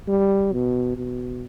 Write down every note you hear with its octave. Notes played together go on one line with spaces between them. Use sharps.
G3
B2
B2